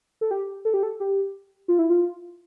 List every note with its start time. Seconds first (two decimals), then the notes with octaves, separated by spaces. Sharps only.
0.21 A4
0.31 G4
0.65 A4
0.74 G4
0.83 A4
1.00 G4
1.68 F4
1.79 E4
1.90 F4